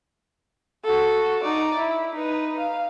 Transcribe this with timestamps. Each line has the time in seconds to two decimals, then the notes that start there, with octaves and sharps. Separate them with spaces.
0.84 F#4 A4
1.42 D#4 D5
1.78 E4
2.15 D#4 B4
2.59 F5